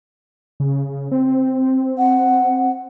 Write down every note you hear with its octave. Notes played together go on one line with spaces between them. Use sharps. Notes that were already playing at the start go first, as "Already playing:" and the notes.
C#3
C4
F#5